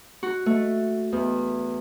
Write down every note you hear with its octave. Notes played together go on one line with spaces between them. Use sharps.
F#4
A3
E2